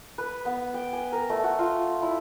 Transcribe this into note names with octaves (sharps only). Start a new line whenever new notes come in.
B4
B3
G5
G#5
A#4
A3
F#4
F4
E4